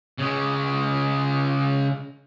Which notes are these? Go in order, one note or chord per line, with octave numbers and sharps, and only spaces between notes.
C#3 G#3